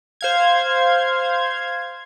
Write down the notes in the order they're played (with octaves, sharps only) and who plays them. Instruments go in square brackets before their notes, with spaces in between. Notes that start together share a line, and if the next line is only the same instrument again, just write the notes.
[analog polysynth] C5 F5 G#6